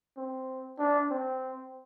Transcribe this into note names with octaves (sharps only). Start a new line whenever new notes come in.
C4
D4
C4